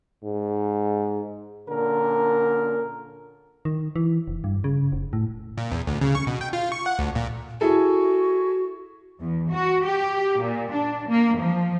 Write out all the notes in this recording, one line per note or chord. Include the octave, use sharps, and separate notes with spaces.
G#2
A#2 D3 C#4 A#4
D#3
E3
F1
G2
C#3
F1
A2
A#2
E2
D2
C#3
C#6
B2
G5
F4
C#6
F#5
D2
A#2
E4 F#4 G#4 A4
E2
F#4
G4
A#2
D4
A#3
F3